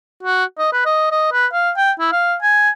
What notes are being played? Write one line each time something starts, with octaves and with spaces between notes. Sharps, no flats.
F#4
D#5
B4
D#5
D#5
B4
F5
G5
E4
F5
G#5